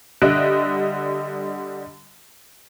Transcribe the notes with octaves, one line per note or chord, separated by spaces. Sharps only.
D3 G3 D#5 E5 F#6 D7